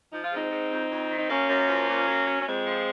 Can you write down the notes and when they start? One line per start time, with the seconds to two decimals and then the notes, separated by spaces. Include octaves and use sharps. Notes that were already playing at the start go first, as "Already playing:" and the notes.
0.12 F3 D#4
0.24 F4
0.31 G#2 C4 D#4
0.51 G#2
0.71 F2
0.90 F2
1.10 D#3
1.18 D#4
1.29 F#2 A#3 C#4
1.49 F#2
1.68 F3
1.88 A#2
2.07 F#3
2.27 F#3
2.41 C#4
2.46 F2 G#3 C4
2.66 F3